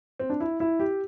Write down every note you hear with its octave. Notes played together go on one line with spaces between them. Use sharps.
C4
D4
E4
E4
G4